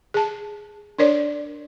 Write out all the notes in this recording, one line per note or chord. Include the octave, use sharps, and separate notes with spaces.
G#4 A5
D4 A#4 C#5 D5